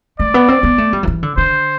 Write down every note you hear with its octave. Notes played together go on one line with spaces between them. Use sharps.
A3 D5
B3
C4
B3
A3
G3
F#3
E3
D3
D3 C5